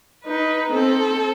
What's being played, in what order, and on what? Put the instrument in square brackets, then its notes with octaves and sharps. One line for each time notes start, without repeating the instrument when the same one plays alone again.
[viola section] D#4 [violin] B4
[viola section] C4 [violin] A4